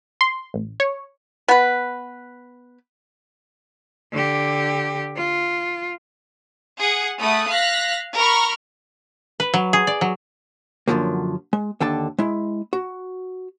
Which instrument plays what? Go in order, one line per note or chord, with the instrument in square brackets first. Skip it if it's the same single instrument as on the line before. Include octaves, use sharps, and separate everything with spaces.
[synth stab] C6
A1
C#5
[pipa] B3 B4
[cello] D3 G4
F4
[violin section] G#4 F#5
A3 F#5 B5 D#6
F5 F#6 A#6 B6
A#4 B5 C#6 F6
[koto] B4
F#3
G#4
D5
F#3
[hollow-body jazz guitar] F#2 A2 D3 F3 F#3 A#3
G#3
D#2 D3 G5 A5
G#3 E4
F#4